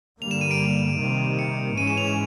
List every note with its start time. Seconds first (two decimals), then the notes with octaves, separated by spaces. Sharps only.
0.21 G2 D3 G3 A#3 F7
0.31 E7
0.41 D#7
0.51 D7
0.99 C3 D#3 G3 A#3
1.39 C#7
1.78 G#2 E3 G#3 C#4 D#7
1.87 E7
1.97 F7
2.07 E7